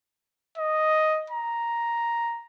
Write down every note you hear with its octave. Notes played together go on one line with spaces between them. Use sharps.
D#5
A#5